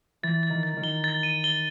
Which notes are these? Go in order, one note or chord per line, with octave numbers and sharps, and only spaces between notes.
E3 A6
A6
D#3
A6
D#3
G7
A6
D#7
G7